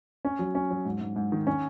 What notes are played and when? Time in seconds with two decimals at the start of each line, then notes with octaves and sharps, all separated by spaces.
0.25 C#4
0.39 F#3
0.55 C#4
0.71 F#3
0.85 G#2
1.01 G#2
1.16 G#2
1.32 D#3
1.47 C#4